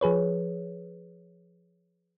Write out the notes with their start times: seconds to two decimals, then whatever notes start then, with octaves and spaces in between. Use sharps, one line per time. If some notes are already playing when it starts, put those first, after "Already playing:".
0.01 F3 G#4 B4 C#5